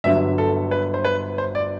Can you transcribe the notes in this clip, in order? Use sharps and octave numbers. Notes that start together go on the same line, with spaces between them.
G1 G2 F#3 E5
A4
B4
C5
B4
C5
D5